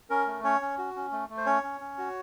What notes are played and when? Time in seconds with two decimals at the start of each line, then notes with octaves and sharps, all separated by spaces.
0.10 C#4 A#4
0.27 A3
0.44 C#4 C#5
0.61 C#4
0.78 F#4
0.96 C#4
1.12 A3
1.30 A3
1.37 C5
1.46 C#4 C#5
1.63 C#4
1.80 C#4
1.98 F#4